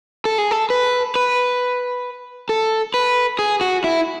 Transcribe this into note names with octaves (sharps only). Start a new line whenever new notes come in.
A4
G#4
A4
B4
B4
A4
B4
G#4
F#4
E4